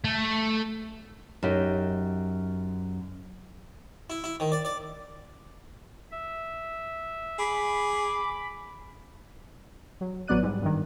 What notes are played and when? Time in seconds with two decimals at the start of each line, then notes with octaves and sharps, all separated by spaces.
0.04 A3
1.43 F#2 D#4 G4
4.10 E4
4.24 E4
4.40 D#3
4.52 D5
4.65 D5
6.11 E5
7.39 G#4 B5 D6
10.01 F#3
10.28 A1 F#3 B3 D5 F#6 D#7
10.43 G#2 G3
10.62 G2 D#3